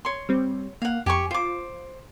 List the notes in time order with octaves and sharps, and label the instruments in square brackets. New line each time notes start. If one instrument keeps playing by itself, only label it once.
[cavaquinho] C#5 C6
[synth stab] G3 C4
[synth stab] A#3 [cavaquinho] F5 F#5
[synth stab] F2 [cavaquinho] G4 G#5 C#6
[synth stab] F4 [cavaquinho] C5 D6